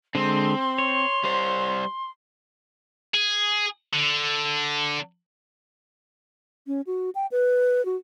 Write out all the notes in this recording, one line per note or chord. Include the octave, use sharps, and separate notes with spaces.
D3 G#3 C4 C6
C#5
G3 C5
G#4
D3
C#4
F#4
G5
B4
F#4